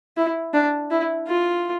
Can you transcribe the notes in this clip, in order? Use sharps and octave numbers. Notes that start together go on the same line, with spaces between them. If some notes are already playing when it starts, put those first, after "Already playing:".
E4
D4
E4
F4